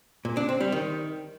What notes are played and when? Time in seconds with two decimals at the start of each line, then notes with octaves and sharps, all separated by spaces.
0.25 A#2
0.37 D4
0.49 C4
0.61 G3
0.72 D#3